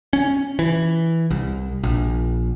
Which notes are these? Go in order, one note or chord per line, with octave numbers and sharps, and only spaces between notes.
C#4
E3
C2
A#1